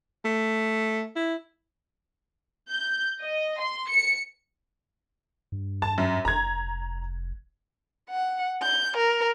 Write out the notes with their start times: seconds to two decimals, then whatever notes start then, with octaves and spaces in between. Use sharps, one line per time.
0.25 A3
1.16 E4
2.69 G6
3.20 D#5
3.60 C6
3.90 C#7
5.52 G2
5.82 A5
5.98 F#2
6.25 F1 A#5 G#6
8.10 F#5
8.63 G6
8.97 A#4